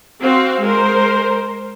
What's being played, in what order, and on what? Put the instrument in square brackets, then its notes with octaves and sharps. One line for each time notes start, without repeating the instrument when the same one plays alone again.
[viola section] C4 F#4 F5
G#3 A#4 C5